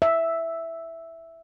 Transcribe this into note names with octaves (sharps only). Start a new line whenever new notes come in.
E5